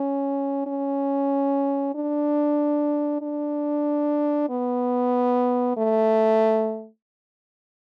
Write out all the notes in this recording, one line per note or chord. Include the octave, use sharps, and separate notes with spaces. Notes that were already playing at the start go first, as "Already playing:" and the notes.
Already playing: C#4
C#4
D4
D4
B3
A3